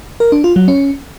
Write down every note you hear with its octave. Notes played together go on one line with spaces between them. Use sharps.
A#4
D4
F4
F#3
C#4